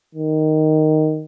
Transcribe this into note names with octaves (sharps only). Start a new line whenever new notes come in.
D#3